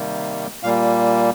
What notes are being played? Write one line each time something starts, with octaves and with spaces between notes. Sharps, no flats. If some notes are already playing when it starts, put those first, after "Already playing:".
Already playing: C3 D#3 G3 A#3
A#2 G3 A#3 F5